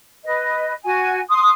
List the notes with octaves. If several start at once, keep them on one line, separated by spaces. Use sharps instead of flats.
B4 D#5
F#4 G#5
C6 D#6